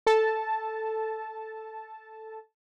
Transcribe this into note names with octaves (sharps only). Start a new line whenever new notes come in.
A4 A5